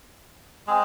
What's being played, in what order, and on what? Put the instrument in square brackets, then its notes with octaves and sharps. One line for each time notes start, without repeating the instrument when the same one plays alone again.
[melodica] G#3 C4 G#4